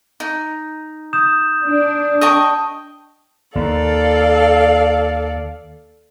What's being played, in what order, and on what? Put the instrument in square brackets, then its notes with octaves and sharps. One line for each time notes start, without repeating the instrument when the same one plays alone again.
[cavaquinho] D#4
[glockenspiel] D#6 G6 E7
[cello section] D4
[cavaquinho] D#5 G5 C#6 [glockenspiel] A5 D#6
[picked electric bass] D#2 [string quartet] A4 D5 F5